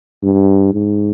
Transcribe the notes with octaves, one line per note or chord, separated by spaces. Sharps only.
G2
G#2